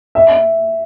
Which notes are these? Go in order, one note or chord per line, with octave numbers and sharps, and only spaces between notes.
E5